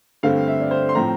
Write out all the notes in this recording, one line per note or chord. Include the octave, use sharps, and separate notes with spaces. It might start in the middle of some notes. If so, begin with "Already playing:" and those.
G2 D3 A3 C4 F5
E5
D5
C5
C6
A2 F3 C4 A#5